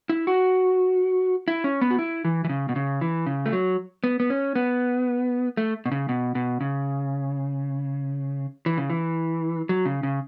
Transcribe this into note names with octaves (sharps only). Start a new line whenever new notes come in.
E4
F#4
E4
C#4
B3
F#4
E4
E3
E3
C#3
B2
C#3
E3
C#3
A3
F#3
B3
B3
C#4
B3
A3
B2
C#3
B2
B2
C#3
E3
C#3
E3
F#3
C#3
C#3